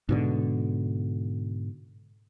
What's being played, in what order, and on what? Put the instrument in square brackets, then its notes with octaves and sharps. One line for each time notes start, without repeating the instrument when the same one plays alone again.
[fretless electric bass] G#2 B2 D3